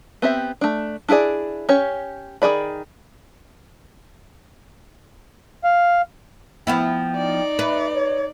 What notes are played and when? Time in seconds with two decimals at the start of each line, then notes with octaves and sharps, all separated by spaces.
0.22 B3 C4 G4 E5
0.61 A3 D4
1.09 D4 E4 F#4 G#4 D5
1.69 C#4 G4 C#5
2.42 D#3 E3 G#4 D5 B5
5.64 F5
6.67 F3 B3 E4 G5
7.15 D#4 D5
7.59 B4 E5
7.94 C#5